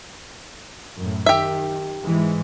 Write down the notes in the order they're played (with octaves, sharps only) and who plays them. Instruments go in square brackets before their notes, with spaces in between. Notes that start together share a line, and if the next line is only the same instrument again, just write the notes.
[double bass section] F#2 A2
[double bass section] D#3 [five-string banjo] G4 E5
[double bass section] G#2 E3 G#3